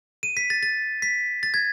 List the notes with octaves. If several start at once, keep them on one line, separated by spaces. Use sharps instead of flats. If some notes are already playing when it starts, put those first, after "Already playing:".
D#7
B6
A6
A6
B6
A6
G#6